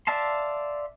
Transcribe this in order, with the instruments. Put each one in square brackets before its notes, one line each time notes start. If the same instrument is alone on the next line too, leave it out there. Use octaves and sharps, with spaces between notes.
[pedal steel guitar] D5 E5 F5 A5 C6